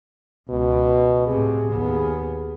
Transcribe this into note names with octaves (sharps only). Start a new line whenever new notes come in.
C#2 B2
A2 C3 G#4
D#2 B3